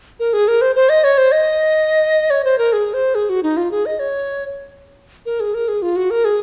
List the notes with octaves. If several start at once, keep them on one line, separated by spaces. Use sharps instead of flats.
A#4
G#4
A#4
C5
C5
D#5
C#5
C5
D#5
C#5
C5
A#4
G#4
C5
G#4
F#4
D#4
F4
G#4
D#5
C#5
A#4
G#4
A#4
G#4
F4
F#4
A#4
G#4